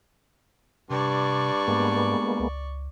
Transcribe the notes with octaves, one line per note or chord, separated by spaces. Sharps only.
G2 C3 D5 C#6
G#2 G#3 A#3 B3
C#2